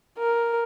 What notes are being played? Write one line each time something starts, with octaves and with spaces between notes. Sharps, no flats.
A#4